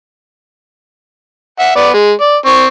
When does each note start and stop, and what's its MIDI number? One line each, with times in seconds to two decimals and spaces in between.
1.59 1.72 76
1.59 1.72 78
1.76 1.89 59
1.76 1.89 74
1.94 2.11 56
2.21 2.36 74
2.46 2.67 60
2.46 2.67 85